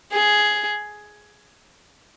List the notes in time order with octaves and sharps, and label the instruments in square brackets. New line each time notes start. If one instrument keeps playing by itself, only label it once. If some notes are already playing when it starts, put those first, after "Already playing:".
[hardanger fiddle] G#4